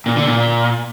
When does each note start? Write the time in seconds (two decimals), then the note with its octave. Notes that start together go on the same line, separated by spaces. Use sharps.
0.06 A#2
0.16 D3
0.26 A#2